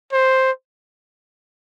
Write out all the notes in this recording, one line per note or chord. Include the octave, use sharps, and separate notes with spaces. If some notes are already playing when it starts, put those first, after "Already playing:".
C5